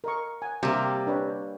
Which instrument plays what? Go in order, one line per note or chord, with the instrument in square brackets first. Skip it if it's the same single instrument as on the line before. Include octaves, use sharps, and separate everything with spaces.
[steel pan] A#4 D#5 C#6
F#5 G#5
[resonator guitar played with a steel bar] C3 [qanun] G3 A#3
[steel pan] D4 B4 C#5